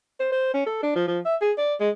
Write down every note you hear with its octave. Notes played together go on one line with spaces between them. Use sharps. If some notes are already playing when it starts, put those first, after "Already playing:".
C5
C5
C#4
A4
D4
F3
F3
E5
G#4
D5
G#3